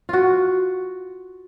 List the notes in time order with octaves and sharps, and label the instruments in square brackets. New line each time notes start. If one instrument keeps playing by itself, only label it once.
[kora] F4 F#4